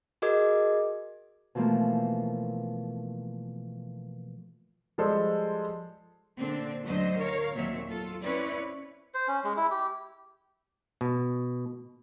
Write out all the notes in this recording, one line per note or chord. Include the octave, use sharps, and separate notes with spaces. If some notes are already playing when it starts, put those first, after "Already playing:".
F#4 G#4 A#4 D#5 D6 G#6
B2 E3 F3 A3 A#3
F3 G3 G#3 A4 C5
A#2 D3 C4 D4
D2 D3 F#3 C5 D#5
A#4 C#5 F5
D#2 A#2 F#3 C4 C#5 E5
F4 A4
C4 C#4 E4 B4 C#5 D5
C5
C#4
G#3
E4
G4
B2